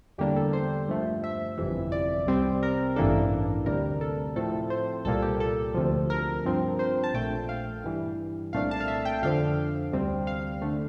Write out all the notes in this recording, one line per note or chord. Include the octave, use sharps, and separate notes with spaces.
E2 D3 G3 A#3 D4 G4
A4
C5
G2 F3 A3
E5
G1 F2 C3 E3
D5
C2 C3 G3 C4
A#4
A1 G2 E3 A#3 D4 A4
D2 C3 G3 A#4
A4
A2 F3 A3 C4 A4
C5
C2 A#2 G3 A#3 A4
G4
A4
D2 C3 F3
A#4
G2 F3 C4
C5
A5
A#1 A#2 A3 G5
F5
G2 E3 G3
C2 A#2 A3 D4 F5
A5
F5
E5
G5
F2 D3 F3 F5
D2 C3 G3 C4
F5
D3 A3